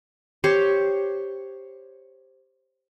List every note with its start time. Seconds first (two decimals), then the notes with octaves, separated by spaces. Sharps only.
0.44 G4 C5 C#5